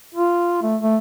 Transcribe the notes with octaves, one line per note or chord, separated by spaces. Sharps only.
F4
A3
A3